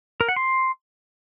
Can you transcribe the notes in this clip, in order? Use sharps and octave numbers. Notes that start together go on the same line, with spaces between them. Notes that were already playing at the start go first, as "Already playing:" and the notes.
A#4
F#5
C6